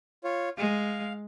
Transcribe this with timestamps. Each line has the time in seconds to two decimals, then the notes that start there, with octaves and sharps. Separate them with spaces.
0.24 F4 C#5
0.58 G#3 F5